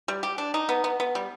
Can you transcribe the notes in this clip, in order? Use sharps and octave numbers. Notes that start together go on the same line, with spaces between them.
G3
G4
D4
D#4
B3
B3
B3
G3